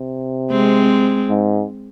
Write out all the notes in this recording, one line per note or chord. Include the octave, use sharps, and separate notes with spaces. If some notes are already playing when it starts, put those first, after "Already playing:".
Already playing: C3
G#3 C4
G#2